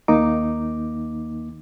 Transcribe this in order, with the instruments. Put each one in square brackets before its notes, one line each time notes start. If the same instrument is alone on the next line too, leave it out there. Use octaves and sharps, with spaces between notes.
[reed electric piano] D#2 D#3 A#3 D#4 D6